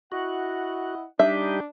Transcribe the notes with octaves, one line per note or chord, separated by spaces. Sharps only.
E4 F#4 D#5 F#5
G3 D4 D#4 G4 E5